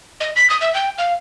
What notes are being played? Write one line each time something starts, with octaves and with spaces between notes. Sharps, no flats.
D#5
B6
D#6
E5
G5
F5